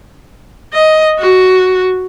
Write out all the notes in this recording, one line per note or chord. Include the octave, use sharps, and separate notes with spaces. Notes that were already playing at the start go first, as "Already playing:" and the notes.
D#5
F#4